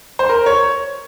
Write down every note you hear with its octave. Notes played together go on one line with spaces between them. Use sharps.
C5
A#4
C#5